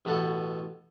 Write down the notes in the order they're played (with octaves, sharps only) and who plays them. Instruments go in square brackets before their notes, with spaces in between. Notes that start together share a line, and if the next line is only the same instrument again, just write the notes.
[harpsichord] A1 B2 A4 F#5